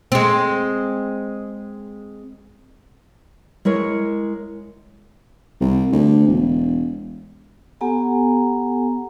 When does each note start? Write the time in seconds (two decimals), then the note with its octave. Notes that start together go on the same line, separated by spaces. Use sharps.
0.12 G#3 C4
3.65 G#3 E4 A#4 C#5
5.61 C2
5.92 D2
6.27 E1
7.81 B3 G4 A4 F#5 G#5 A#5